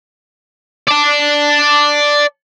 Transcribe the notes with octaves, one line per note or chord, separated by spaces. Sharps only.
D5 A5